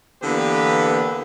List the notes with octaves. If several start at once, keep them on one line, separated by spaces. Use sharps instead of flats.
D3 E3 A#3 B3 G4 B4